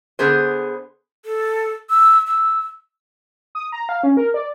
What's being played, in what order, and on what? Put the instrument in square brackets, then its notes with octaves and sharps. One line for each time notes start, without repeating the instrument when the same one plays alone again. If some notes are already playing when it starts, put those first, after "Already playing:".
[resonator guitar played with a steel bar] D3 B3 G#4 C5
[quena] A4
E6
E6
[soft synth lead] D#6
A#5
F5
C#4
A#4
D5